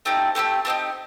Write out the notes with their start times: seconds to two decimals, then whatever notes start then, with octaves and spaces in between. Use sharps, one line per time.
0.05 A3 C4 D#4 G4
0.35 A3 C4 D#4 G4
0.65 A3 C4 D#4 G4